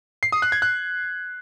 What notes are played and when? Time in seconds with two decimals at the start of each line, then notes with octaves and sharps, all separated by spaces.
0.23 C7
0.32 D#6
0.42 F#6
0.52 G#6
0.62 F#6